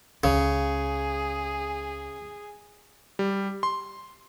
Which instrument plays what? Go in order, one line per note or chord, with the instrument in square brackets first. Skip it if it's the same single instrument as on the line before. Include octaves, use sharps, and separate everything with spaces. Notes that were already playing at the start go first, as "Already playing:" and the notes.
[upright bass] C#2 [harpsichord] C#3 [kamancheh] G#4
[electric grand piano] G3
C6